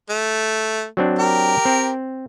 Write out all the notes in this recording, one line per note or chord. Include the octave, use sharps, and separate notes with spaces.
A3
F#3 C4 D4
G4 A#4
C4